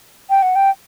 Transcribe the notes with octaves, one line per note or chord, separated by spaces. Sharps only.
G5
F#5
G5